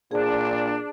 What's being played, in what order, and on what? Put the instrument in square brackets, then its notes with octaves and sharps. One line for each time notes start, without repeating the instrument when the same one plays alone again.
[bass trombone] A#2 [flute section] D4 [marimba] G#4 C5